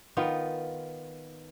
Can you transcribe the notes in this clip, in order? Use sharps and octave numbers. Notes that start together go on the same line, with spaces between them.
D#3 B3 F4